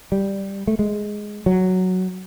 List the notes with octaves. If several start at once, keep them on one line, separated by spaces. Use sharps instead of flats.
G3
A3
G#3
F#3